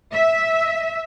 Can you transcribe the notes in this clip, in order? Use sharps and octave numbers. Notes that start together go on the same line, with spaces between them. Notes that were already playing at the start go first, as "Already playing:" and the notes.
E5